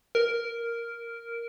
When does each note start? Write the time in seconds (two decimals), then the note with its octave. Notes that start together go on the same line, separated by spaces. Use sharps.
0.15 A#4